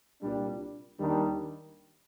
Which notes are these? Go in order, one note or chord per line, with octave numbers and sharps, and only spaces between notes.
C2 A#2 G3 D4
D#2 D#3 G3 D4